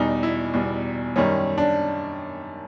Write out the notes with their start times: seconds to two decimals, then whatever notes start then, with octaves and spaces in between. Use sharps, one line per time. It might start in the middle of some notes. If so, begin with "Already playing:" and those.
Already playing: E2 B2 G3 D#4
0.23 E4
0.54 E2 B2 G3
1.16 F#2 D#3 G3 C#4
1.58 D4